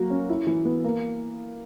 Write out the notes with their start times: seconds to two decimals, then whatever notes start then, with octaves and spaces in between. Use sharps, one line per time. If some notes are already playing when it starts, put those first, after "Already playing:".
Already playing: F#3 A#3 F#4
0.10 C#4
0.29 E4
0.47 E3
0.65 B3
0.84 A#3